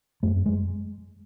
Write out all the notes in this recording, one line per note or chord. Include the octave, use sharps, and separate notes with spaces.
F#2 A3
G#3